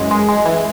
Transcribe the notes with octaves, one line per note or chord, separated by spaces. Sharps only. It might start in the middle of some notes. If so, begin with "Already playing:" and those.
Already playing: F#2 E3 G#3
G#3
G#3
E3